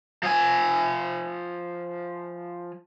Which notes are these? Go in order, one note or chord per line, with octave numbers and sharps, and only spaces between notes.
F3 G#5